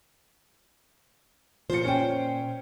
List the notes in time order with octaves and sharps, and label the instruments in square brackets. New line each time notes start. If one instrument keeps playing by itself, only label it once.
[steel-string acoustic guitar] A#2 C5 [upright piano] F3 C#7
[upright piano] C#4 G5